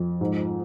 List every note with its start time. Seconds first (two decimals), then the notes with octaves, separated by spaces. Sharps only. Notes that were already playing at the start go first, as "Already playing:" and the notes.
Already playing: F2
0.21 G#2